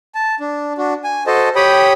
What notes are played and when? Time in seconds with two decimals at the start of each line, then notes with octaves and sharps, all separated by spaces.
0.15 A5
0.40 D4
0.78 D4 F#4
1.04 G#5
1.27 F#4 A4 C5 D#5 A5
1.56 G4 C#5 G5 B5 D#6